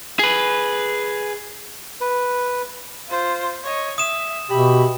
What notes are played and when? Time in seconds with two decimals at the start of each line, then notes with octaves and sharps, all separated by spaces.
0.19 G#4 B4
2.01 B4
3.09 F4 C5
3.64 C#5 D#5
3.98 E5 D#6 E7
4.50 B2 G4 E5 B5